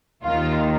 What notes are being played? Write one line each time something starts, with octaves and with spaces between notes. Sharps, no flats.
D#2 D#3 F4